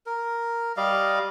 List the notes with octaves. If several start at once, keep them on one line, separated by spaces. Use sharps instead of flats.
A#4
G3 D5 D#5 F5